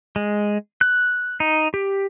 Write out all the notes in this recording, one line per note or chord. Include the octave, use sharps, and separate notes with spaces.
G#3
F#6
D#4
G4